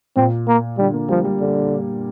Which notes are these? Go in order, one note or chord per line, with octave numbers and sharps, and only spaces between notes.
A#2 C4
A#3
D3 G3
A#3
F3 G3
G3
D3